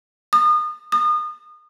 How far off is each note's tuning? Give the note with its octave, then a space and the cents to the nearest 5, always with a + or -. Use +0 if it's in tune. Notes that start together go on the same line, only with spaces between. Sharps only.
D#6 -35
D#6 -35